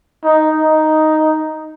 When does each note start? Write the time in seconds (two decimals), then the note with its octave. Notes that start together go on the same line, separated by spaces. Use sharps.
0.24 D#4
0.59 D#4